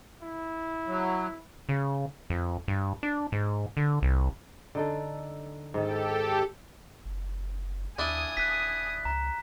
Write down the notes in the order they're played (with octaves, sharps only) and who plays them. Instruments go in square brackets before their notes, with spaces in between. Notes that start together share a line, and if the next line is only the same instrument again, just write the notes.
[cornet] E4
[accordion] F#3
[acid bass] C#3
F2
G2
D4
G#2
D3
C2
[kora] D3 D#4 A4
[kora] G#2 D#3 [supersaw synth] G4 A4
[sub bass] F#1
[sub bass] D#2 [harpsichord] D4 E4 [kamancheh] G#5 D#6
[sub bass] D#1 [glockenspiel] F#6 B6
[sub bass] C#2 [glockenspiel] A#5